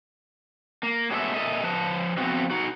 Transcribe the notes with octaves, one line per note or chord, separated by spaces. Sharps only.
A#3
F#3 G#3 A3 B3 E5
A#2 E3 A4 D#5 E5
F3 B4 A5
F3 A3 B3 C4 F#4 B4
D#4 F#4